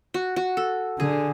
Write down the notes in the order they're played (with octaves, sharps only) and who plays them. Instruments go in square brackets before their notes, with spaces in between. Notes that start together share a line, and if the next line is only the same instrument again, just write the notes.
[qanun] F#4
F#4
A4
[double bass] D3 [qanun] G#4